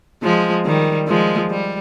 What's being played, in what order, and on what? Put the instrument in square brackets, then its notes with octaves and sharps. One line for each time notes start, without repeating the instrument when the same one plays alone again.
[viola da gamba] F3 G#3
D#3 G3
F3 G#3
G3